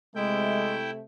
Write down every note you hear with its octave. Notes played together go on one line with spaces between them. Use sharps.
C3 G#3 A3 E4 G5